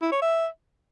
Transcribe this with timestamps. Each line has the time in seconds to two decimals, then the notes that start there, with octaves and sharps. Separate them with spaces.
0.02 E4
0.12 C#5
0.22 E5